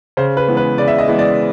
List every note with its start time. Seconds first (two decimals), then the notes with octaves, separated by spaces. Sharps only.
0.17 C#3 C5
0.37 B4
0.48 E3 G#3 B3
0.57 B4
0.78 C#3 D5
0.88 E5
0.98 D#5
1.08 E3 G#3 B3
1.19 D5